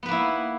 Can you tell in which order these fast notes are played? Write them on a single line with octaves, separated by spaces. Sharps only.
B3 B4 A#3 E4